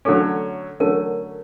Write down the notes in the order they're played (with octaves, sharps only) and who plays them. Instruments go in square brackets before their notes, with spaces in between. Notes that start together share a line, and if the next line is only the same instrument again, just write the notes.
[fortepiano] D3 F#3 A3 C#4 [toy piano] A4
[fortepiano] D3 F#3 A3 C#4 [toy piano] A#4